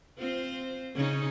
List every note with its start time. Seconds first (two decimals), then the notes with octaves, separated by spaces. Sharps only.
0.19 C4 F4 C5
0.95 C#3 C#4 D#4